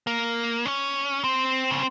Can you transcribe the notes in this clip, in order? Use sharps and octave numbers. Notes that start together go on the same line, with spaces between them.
A#3
C#4
C4
C#3